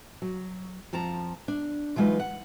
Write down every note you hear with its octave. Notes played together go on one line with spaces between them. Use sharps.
F#3
F2 F3 A5 A#5
D4
E3 F#3 G#3 D#4 F4 B4
F#5